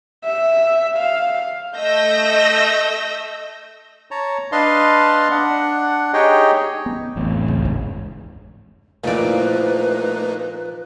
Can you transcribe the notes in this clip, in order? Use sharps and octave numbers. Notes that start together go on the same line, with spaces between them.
E5
F5
A3 D#5 E6 G6 A#6
C#5 A5 A#5
D4 B4 D#5 F5 A5 C6
D4 F#5
D#4 G4 G#4 C#5 D#5 G5
B3
A1 F2 A2
C#2
G#1 E2 G#2
A#2 F3 A3 A#3 D#4 E4 B4 D5